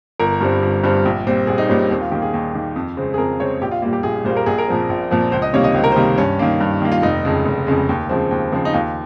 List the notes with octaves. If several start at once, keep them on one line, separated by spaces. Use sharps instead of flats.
G1 A#4
G2 G3 C4
G1
G2 G3 C4
A#1
A#2 G3 C4
A#1 G#4
D#4
A#2 G3 C4 C#4
C4
D#2 C4
F4
D#3 A#3 G4
G#4
D#2
D#3 A#3
F2
C#3 G#3 C4
G#4
F2 A#4
C#3 G#3 C4 C#5
A#1 G4
F4
A#2 G3 A#3 F4
G4
A#1 G#4
A#2 G3 A#3 C5
A#4
A#1 G#4
A#4
A#2 F3 C4
A#1
A#2 F3 C4
C#2 C5
D#5
C3 D#3 G3 A#3 C#5
D#5
C#2 C5
A#4
C5
C3 D#3 G3 A#3
G2 C#4
D#3 A#3
G2
D#3 A#3
F4
F1 D#4
F2 C#3 G#3
F1
F2 C#3 G#3
D#2
C#3 F3 G#3 C4
D#2
C#3 F3 G#3 C4
D#4
D#2 F4